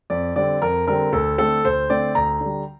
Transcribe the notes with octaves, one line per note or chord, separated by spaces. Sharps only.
F2 D5
D3 G3 C4 D5
F2 A#4
D3 G3 C4 A#4
D2 A4
D3 A3 C4 A4
D2 C5
D3 A3 C4 D5
D2 A#5
D3
G3